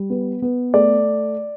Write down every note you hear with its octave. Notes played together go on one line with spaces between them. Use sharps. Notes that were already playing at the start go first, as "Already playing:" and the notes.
Already playing: G3
B3
B3
A3 D5